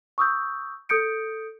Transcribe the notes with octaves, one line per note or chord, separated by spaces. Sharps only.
C#6 D#6 E6 G6
A4 D#6 G6 C#7 D7